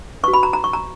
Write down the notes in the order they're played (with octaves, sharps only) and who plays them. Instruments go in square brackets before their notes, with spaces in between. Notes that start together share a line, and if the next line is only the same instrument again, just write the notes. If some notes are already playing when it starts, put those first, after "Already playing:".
[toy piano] F#4 B4 C#6
B5
A#5
A#5
C#6
A#5